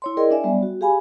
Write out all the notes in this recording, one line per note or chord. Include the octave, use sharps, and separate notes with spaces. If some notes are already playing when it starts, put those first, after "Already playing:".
E4 C#5 C6
E4 G#4 A#4 D5 D#5 G5
D4 C#5 D5 E5 G#5
F#3 G3 B3 D5
F#4
G4 G#4 F5 G#5 B5